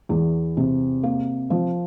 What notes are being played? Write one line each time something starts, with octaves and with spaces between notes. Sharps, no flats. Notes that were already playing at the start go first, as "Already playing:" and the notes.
E2
C3
A#3
F3